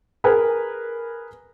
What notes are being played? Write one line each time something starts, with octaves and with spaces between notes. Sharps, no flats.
G#4 A#4 B4 G#5